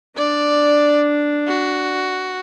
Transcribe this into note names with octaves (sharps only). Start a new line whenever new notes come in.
D4 D5
F#4